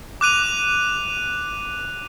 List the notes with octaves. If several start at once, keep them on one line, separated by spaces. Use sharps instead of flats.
D6 F#6 D#7 F7